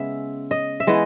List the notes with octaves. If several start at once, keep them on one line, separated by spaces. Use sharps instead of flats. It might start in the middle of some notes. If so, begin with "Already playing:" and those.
Already playing: C#3 G#3 B3 E5
D#5
E5
E3 G#3 B3 D#5